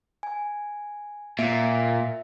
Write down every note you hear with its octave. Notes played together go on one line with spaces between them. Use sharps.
G#5
A#2 E5